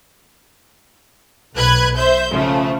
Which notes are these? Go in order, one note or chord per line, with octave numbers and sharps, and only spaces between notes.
B1 B4 F#6 G#6
C5 E5 G6
C#3 F3 A3